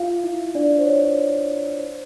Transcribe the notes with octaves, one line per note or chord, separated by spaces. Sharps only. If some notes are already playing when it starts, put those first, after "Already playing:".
Already playing: F4 F5
E4 E5
D4 D5
C5
C#5
C5